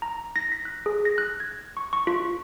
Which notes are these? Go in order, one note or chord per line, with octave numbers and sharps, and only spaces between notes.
A#5
A#6
B6
F#6
G#4
A#6
F#6
G#6
C#6
C#6
F4